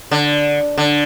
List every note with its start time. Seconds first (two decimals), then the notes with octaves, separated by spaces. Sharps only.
0.11 D3
0.77 D3